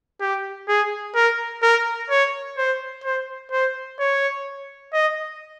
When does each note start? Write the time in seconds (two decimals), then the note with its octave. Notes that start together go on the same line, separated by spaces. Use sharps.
0.21 G4
0.68 G#4
1.15 A#4
1.63 A#4
2.10 C#5
2.58 C5
3.04 C5
3.52 C5
3.99 C#5
4.93 D#5